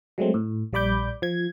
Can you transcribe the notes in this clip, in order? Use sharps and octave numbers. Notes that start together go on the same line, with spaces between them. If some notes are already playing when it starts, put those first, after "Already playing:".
F#3 G#3 A3 C4
A2
A#1 G3 D5 B5 D6 G6
F3 G#6